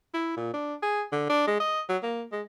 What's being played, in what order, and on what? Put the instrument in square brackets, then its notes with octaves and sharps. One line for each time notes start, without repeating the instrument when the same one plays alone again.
[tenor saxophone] E4
A#2
D4
G#4
D3
D4
G#3
D#5
F#3
A#3
G#3